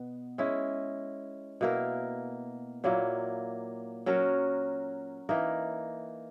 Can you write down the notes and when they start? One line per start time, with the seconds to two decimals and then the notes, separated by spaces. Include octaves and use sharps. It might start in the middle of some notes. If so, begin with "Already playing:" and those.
Already playing: B2 B3
0.38 G#3 C#4 E4
1.61 B2 A#3 E4 A#4
2.84 A#2 F#3 A#3 E4
4.06 F#3 C#4 F#4 A#4
5.29 E3 A#3 D#4 A#4